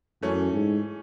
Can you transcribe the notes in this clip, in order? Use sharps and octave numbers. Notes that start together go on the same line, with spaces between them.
F#2 E3 A3 C#4
G#2